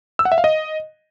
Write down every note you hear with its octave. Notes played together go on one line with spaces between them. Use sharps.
E6
F#5
E5
F5
D#5